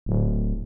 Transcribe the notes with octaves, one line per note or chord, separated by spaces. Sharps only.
D1